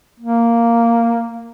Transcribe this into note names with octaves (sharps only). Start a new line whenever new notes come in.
A#3